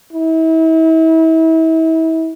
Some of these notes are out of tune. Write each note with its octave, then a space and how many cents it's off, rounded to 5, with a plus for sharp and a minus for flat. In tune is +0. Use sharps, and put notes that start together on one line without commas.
E4 -35